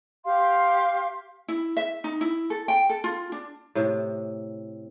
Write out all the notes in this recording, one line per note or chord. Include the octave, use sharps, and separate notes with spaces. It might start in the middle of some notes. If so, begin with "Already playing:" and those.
G4 F5 C6
E4
E5
D#4
E4
A4
G5
A4
F4
D4
A2 C3